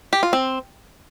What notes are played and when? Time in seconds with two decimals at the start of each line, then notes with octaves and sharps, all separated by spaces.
0.13 G4
0.23 F4
0.33 C4